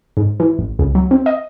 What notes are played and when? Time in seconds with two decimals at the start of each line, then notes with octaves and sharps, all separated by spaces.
0.17 G#2
0.40 E3
0.58 A1
0.79 C#2
0.95 F#3
1.11 C4
1.26 D#5